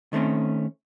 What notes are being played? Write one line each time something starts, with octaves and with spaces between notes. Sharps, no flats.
D#3 A3 C4 C#4